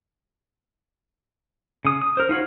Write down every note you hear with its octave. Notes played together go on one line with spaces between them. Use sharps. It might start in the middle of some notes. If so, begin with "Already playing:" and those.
C#3 D#6
D#6
A#4 C5
D#4 F4 F#4 C#5